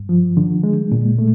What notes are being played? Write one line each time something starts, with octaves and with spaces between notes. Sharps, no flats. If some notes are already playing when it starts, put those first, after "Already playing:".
Already playing: G2
F3
D3
G#3
A#2
A3